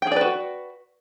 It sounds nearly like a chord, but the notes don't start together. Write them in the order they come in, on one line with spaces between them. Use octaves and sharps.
G5 G#4 D5 B4 F#4